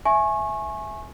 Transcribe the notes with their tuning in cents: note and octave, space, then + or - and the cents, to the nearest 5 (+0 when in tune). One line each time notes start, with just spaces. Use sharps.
E5 +0 G#5 +15 C#6 -25